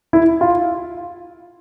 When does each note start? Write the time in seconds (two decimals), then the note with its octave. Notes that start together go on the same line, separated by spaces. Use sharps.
0.13 E4
0.41 F4